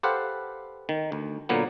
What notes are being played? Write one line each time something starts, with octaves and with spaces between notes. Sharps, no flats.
G4 A4 B4 C5 F5 F#5
D#3
D2
A#2 D3 F#3 A#3 B3